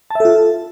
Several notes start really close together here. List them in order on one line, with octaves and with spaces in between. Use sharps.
A5 E5 A4 F4